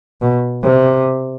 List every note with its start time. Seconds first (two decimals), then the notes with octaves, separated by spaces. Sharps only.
0.21 B2
0.63 C3